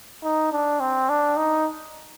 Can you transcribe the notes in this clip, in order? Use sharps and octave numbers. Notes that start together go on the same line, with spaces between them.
D#4
D4
C4
D4
D#4